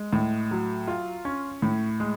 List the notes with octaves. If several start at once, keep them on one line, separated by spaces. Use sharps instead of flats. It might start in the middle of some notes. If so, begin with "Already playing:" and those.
Already playing: G#3
A2
F#3
F4
C#4
A2
G#3